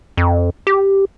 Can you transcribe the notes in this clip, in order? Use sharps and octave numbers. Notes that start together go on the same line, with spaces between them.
F2
G4